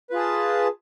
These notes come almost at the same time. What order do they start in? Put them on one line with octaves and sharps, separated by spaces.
B4 F4 G#4 A5